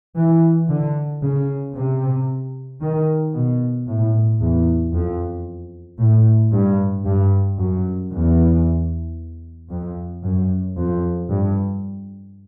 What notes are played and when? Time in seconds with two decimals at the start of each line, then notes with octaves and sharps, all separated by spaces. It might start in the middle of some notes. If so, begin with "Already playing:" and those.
0.16 E3
0.69 D3
1.22 C#3
1.75 C3
2.81 D#3
3.34 B2
3.87 A2
4.40 E2
4.94 F2
5.99 A2
6.52 G2
7.05 G2
7.58 F#2
8.11 E2
9.70 F2
10.24 F#2
10.76 F2
11.29 G2